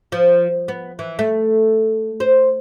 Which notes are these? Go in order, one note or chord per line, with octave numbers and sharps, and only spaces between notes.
F3
B3
E3
A3
C5